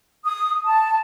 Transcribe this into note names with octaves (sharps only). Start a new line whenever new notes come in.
D#6
A5